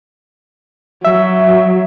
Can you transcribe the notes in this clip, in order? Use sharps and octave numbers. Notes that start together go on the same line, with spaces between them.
F#3 E5